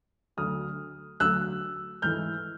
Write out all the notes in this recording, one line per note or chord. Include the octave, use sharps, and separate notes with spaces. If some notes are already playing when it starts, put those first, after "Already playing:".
D2 D3 F#3 A3 D#6 F6
D2 D3 F#3 A3 E6 F#6
G#2 E3 A3 F6 G6